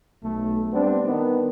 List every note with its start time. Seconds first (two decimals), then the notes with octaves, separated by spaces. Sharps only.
0.23 B1 A3
0.73 G3 B3 C4 D4
1.06 D#3 B3